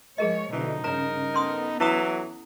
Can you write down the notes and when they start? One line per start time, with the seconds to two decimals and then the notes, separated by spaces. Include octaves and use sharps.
0.18 F3 G#3 G#4 A#4 C#5 D#5
0.52 B2 D3 E3 F3 D#4
0.84 G2 C#3 A#4 C#5 A#5
1.34 B3 C#4 A4 C6 D#6
1.80 E3 F#3 E4 A#5 D#6